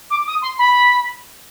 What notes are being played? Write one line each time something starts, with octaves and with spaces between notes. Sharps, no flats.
D6
D#6
C6
B5